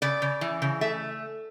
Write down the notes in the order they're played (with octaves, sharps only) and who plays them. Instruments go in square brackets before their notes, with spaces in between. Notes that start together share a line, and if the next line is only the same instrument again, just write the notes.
[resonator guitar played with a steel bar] C#3 D5
C#3
E3
C#3
A3 E5